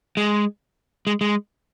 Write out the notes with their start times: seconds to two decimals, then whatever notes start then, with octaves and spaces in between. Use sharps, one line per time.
0.17 G#3
1.07 G#3
1.21 G#3